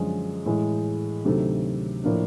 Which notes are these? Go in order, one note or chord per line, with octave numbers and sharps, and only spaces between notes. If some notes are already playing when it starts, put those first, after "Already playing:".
Already playing: F#2 D3 F3 G#3
A2 E3 G#3
D2 C3 D#3 F#3 A3
A2 F3 A#3 D4